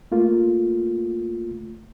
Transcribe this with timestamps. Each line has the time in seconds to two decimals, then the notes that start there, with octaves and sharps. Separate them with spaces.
0.12 A3 A#3 F4